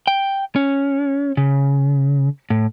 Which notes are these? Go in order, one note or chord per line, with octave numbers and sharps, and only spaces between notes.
G5
C#4
C#3
A2